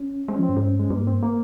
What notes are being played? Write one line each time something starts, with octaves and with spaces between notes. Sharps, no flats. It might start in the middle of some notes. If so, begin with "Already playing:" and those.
Already playing: C#4
G#3 C4
C#4
F3 C4
G2
G#2
G2
G#2
G2 G#3
G2 A#3
G#2
C4
G2
A#3